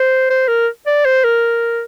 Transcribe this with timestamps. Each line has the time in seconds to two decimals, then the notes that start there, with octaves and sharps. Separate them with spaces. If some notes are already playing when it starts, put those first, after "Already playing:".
Already playing: C5
0.30 C5
0.48 A#4
0.86 D5
1.05 C5
1.24 A#4